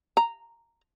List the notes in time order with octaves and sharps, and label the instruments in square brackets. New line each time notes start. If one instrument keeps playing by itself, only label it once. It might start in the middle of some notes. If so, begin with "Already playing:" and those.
[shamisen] A#5